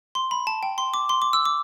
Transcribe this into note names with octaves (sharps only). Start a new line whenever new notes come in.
C6
B5
A5
G5
C6
D6
C6
D6
E6
D6